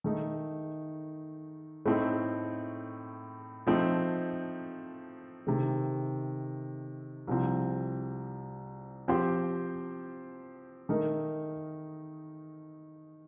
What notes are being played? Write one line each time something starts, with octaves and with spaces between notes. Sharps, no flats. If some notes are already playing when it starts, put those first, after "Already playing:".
D#3 A3 D#4
A2 A3 C4 D#4
F3 A3 C4 D#4
C3 D#3 A3
C2 C3 F3 C4
F3 C4 G4 C5
D#3 A3 D#4 A#4